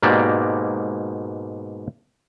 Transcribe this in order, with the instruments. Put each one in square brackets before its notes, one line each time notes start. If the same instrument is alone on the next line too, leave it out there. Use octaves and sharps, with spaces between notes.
[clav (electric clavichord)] G#2 B2 A#3 G4 D5 A#5